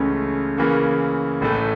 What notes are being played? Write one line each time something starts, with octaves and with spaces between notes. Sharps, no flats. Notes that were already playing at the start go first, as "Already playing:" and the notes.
Already playing: C#2 C#3 E3 A3 C#4
C#3 E3 A#3 C#4
A1 A2 E3 A3